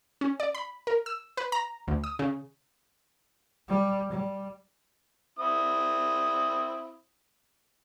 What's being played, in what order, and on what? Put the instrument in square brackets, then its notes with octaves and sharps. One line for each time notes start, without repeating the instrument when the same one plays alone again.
[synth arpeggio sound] C#4
D5
B5
A#4
E6
B4
A#5
D2
D#6
C#3
[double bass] G3
G3
[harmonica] C4 E4 D#6